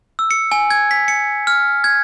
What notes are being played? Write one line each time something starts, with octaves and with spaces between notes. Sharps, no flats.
E6
C#7
G#5
G#6
B6
C#7
F6
G#6